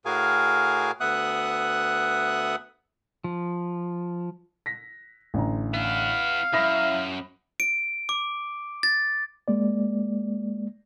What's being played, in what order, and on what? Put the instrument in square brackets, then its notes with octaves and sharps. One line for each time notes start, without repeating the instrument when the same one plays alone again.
[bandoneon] A2 F#4 G#4 A#4 F5 G#5
D2 B3 E5 F#5 D#6 F#6
[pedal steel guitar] F3
[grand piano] A#6 B6
A1 D3 A#5
[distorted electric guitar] B3 E4 [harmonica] F5
[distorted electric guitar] F#2 [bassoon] E4 [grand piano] B5 D#6 A#6
[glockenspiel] D7
D6
A6
[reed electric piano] G#3 A#3 D5